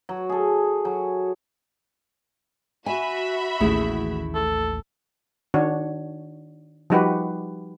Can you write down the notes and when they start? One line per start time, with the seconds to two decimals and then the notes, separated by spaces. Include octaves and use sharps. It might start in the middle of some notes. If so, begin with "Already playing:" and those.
0.09 F#3
0.29 G#4 A4
0.85 F#3
2.86 F#4 E5 G#5 B5
3.60 A1 D#2 A3 E4 G#4
4.35 A4
5.54 D#3 D4 F#4 C#5
6.90 F3 G3 D#4 F#4 G4 B4